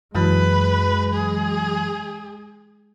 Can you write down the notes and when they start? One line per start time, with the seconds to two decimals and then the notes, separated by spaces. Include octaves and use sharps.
0.14 F#2 E3 F#3 G#3 B4
1.14 G#4